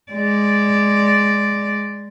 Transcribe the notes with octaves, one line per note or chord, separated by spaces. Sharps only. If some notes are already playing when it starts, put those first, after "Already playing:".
G#3 D5